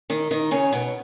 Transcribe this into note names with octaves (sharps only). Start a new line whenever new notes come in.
D#3 D#4
D#3 D#4
C#3 C#4
B2 B3